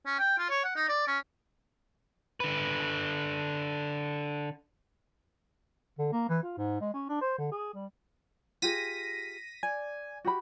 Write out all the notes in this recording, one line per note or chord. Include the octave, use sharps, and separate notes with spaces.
C#4
G5
F4
C#5
F#5
D#4
D5
C#4
D3 B4
D3
A#3
E3
F4
G#2
G#3
C#4
D4
C5
D3
G#4
G3
F4 G4 G#4 A#6 B6 D#7
D5 G#5
F#4 G4 B5